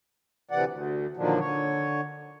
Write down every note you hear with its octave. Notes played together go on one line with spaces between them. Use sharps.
D2 C3 E3 D5 F#5
D2
A#2 D3 D#3 F3 F#3 D4
D3 C#5